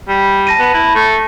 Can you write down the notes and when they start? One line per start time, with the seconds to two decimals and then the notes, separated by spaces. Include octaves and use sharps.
0.08 G3
0.47 A5 A#6 D#7
0.59 B3
0.74 E4
0.95 A3